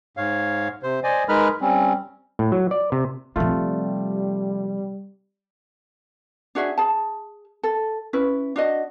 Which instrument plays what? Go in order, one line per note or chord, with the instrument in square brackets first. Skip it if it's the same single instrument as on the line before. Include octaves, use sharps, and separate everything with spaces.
[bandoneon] G#2 C#5 F5
C3 C5
C5 D5 D#5 G#5
G#3 D#4 A#4 B4 B5 F6
G3 C4 C#4
[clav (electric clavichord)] A2
F#3
D5
C3
[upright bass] C3 F3 [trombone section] G3 [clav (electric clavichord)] A3 F4
[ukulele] D4 F#4 G#4 E5
G#4 A5
A4
C#4 E4 B4
D4 F#4 D#5